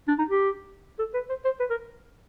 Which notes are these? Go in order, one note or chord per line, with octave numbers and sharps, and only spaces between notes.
D4
D#4
G4
A4
B4
C5
C5
B4
A#4